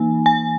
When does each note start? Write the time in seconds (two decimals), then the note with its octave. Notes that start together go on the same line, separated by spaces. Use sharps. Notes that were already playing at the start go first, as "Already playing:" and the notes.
Already playing: E3 A#3 D#4 G#5
0.26 G#5